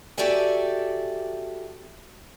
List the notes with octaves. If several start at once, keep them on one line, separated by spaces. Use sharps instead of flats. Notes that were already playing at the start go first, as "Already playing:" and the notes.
F#4 G4 A4 D5 E5 G#5